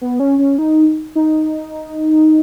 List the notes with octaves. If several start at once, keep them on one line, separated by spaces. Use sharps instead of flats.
B3
C#4
C#4
D#4
D#4